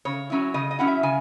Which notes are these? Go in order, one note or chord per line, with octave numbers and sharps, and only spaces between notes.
C#3 C#5
F#3 C#4 E4
C#3 D#5
D#5
F#3 C#4 E4 F#5
E5
C#3 G#5